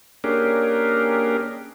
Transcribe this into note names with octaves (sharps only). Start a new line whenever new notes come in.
A#3 C#4 D4 G4 G#4 A#4